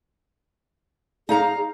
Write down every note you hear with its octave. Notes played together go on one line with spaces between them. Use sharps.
D#4 G#4 F5 A#5